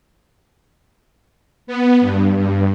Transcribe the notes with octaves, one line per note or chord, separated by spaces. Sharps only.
B3
G2
G2